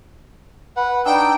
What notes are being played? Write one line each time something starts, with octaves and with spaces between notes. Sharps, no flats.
B4 F#5
D4 D#4 G5 E6